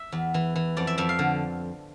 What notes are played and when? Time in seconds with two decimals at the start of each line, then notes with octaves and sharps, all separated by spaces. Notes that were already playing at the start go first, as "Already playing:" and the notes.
Already playing: E5
0.12 E2
0.34 E3
0.56 E3
0.77 F2 D5
0.87 E5
0.97 F2 E5
1.09 F5
1.19 D3